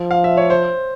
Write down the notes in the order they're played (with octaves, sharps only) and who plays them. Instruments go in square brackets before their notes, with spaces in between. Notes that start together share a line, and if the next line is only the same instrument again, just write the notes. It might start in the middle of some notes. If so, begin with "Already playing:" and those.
Already playing: [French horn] F3
[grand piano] F5
E5
C#5
C5